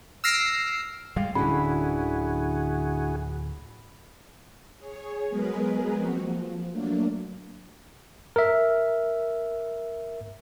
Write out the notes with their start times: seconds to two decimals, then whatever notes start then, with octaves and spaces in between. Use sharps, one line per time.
0.24 E6 F6 A#6 C7 D7
1.16 G3 G#3 F5 G5
1.35 D1 D3 C#4 E4 F#4 G#4 B5
4.79 G#4 C#5
5.30 F#3 G#3 B3 G#4 A#4 B4
5.95 F3 A#3 C4 F#4
6.25 F3
6.71 F#3 A3 A#3 D4
8.36 A#4 E5